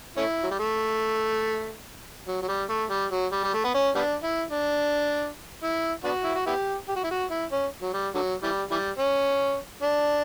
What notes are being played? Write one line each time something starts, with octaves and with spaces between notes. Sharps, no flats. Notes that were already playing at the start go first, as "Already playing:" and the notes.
A3 C#4 E4
F#3
G3
A3
F#3
F#3
G3
A3
G3
F#3
G3
G3
A3
B3
C#4
G3 B3 D4
E4
D4
E4
B3 D4 F#4
E4
F#4
B3 E4 G4
G4
F#4
E4
F#4
E4
C#4
F#3
G3
D3 F#3
E3 G3
E3 G3
C#4
D4